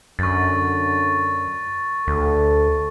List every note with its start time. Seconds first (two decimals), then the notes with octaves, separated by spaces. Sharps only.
0.19 F#2 D3 C#6 A6
2.07 D2 A4